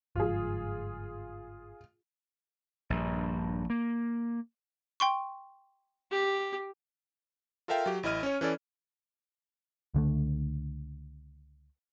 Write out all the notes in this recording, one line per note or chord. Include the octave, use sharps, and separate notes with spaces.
G1 G#2 F3 F4 G#4
A#1 G2
A#3
G5 C6 C#6
G4
F4 A4 A#4 E5 F5 G5
F#3 G4
A1 E4 D#5 F6 D#7
C#4 C#5
E3 C#4 A4 D5
C#2 D3 A3